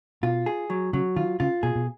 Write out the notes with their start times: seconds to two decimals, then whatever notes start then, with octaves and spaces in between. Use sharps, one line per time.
0.23 B2 F4
0.46 G#4
0.70 F#3
0.93 C#3 F#3
1.16 D#3 F4
1.40 C#3 F4
1.63 B2 G#4
1.75 B2